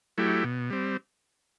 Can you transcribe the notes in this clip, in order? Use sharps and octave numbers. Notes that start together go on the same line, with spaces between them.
F#3 A3 E4 G4
B2
G3 C4